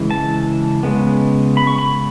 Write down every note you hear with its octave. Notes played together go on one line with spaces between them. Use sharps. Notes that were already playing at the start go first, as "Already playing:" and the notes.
Already playing: C#3 E3 G#3
A5
C#3 G#3 B3
B5
C#6
B5